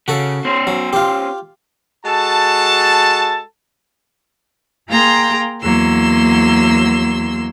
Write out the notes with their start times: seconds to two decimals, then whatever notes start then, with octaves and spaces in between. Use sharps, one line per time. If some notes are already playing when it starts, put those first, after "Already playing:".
0.08 C#3 F#4 A4
0.45 C#4 C5
0.67 F#3
0.93 F4 G4
2.05 G#3 F#4 A4 A5
4.88 A#3 G#4 F5 G5 A#5 C6
5.62 E2 F#3 A#3 C6 E6